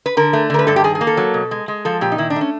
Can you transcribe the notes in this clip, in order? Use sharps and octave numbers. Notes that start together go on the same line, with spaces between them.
B4
D3 A#4
A3
D3 A#4
B4
G2 A4
G4
D#3 G#4
G#4
A#3
A4
F#3
B2
G#3
G#3
F3 A4
A#2 G4
D#4
D#3 E4
D4
A3
C#4